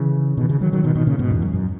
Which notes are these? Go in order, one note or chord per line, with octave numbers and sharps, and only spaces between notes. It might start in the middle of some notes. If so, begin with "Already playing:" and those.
Already playing: C#3 E3
B2 D#3
C#3 E3
D#3 F#3
D#3 F#3
B2 D#3
B2 D#3
A#2 C#3
G#2 B2
E2
F#2
F#2